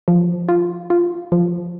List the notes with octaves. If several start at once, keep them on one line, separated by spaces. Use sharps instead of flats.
F3
F4
F4
F3